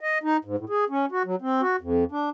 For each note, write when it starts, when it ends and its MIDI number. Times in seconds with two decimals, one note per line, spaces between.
0.01 0.18 75
0.24 0.37 63
0.45 0.56 44
0.58 0.65 45
0.69 0.85 68
0.90 1.06 61
1.12 1.23 66
1.26 1.36 54
1.42 1.61 60
1.61 1.76 66
1.81 2.04 41
2.12 2.30 62